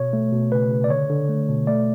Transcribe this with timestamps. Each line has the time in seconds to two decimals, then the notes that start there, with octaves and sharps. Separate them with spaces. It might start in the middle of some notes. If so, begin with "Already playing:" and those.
Already playing: B2 C#5
0.13 A3
0.33 B2
0.52 C#3 B4
0.71 C#3
0.84 D5
0.90 D3 C#5
1.10 D3
1.29 A3
1.49 B2
1.67 A3 D5